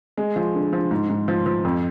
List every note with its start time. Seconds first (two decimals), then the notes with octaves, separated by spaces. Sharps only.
0.17 G#3
0.36 F3
0.55 D3
0.73 F3
0.91 G#2
1.09 G#2
1.28 F3
1.46 F3
1.65 F2